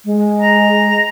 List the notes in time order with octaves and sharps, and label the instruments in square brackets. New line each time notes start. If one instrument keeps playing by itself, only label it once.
[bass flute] G#3
[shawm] A#5